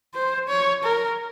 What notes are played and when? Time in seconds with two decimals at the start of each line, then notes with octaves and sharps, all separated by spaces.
0.14 C5
0.48 C#5
0.84 A#4